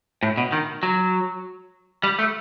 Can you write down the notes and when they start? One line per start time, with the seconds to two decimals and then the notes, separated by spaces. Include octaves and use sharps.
0.23 A2
0.37 B2
0.52 D#3
0.83 F#3
2.03 G3
2.19 A3